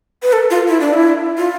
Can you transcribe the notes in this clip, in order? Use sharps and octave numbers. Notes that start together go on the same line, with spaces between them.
B4
A4
F4
E4
D4
E4
F4